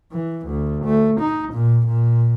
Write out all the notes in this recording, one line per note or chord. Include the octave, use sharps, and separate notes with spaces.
E3
D2
A3
D#4
A#2
A#2